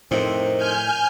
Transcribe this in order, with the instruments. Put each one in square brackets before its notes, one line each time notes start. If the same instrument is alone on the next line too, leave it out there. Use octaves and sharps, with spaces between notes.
[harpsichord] F2 C3 [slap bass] A2 [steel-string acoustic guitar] C4 D#4 A#4
[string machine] G#5 F6 G6